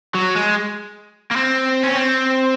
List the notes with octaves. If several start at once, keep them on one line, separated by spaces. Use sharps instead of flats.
F#3
G#3
A#3
C4
C#4
C4